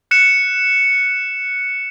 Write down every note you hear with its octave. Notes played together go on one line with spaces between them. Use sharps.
F#6 C#7 E7